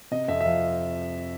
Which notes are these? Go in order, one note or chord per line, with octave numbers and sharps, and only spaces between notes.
C3 D#5
F2 E5
E5
F3 F5